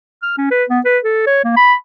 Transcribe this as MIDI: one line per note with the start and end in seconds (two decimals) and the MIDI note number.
0.23 0.33 89
0.38 0.46 61
0.51 0.64 71
0.70 0.80 59
0.85 0.99 71
1.04 1.24 69
1.27 1.40 73
1.44 1.54 58
1.57 1.74 83